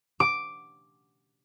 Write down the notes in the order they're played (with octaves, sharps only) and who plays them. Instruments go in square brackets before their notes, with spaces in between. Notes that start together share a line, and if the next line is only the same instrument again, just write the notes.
[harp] D6